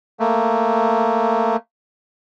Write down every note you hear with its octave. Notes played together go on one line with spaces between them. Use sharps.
A3 A#3